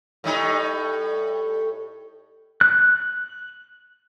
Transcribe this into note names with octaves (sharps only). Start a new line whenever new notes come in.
A2 G3 D#4
F#6